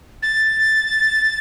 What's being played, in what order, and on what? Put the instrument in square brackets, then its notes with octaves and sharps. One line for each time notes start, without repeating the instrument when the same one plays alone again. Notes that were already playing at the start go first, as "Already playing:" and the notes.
[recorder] A6